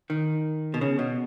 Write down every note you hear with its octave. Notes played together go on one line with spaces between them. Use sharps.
D#3
B2
C#3
B2